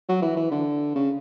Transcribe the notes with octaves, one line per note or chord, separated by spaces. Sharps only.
F#3
E3
E3
D3
C#3